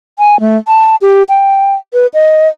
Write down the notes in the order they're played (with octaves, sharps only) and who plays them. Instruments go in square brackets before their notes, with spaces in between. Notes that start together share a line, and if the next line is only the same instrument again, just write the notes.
[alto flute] G#5
A3
A5
G4
G5
B4
D#5